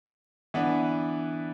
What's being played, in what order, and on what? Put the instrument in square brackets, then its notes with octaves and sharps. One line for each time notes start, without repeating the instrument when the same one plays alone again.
[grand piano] E3 B3 D4